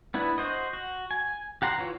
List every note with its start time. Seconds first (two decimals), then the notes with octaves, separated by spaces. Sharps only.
0.14 B3 D4 E4 B4
0.38 F#4 C5 D#5
0.73 F#4
1.11 G#5
1.62 G4 F#5 A#5 C6
1.78 E3 F4 C#5